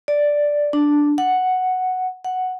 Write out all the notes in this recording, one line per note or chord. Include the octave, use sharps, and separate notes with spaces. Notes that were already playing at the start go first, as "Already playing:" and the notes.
D5
D4
F#5
F#5